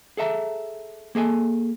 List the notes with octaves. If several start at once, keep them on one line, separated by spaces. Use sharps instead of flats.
G#4 A4 E5 A#5
A#3 G#4 A4 G#5